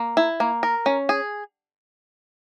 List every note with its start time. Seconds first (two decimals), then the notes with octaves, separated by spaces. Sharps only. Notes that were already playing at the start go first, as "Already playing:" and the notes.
Already playing: A#3
0.17 E4
0.40 A#3
0.63 A#4
0.86 C#4
1.09 G#4